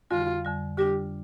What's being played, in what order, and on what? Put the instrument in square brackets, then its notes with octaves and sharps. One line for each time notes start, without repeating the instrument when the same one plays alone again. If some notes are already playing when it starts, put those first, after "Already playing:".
[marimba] F2 D3 G3 [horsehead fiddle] F4
[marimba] F2 D3 G3
[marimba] D3 G3 D4 F4 [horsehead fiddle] G4